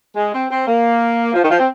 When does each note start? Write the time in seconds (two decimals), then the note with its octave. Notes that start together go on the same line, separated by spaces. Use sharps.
0.15 G#3
0.33 C4
0.49 C4
0.66 A#3
1.34 F3
1.43 D#3
1.50 F3
1.59 C4